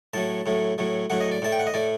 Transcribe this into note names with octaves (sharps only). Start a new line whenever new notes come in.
A2 F#3 A3 A5
A2 F#3 A3
A2 F#3 A3
A2 F#3 A3 F#5
D#5
D5
A2 A3 A5
G5
F#5
D#5
A2 A3 D5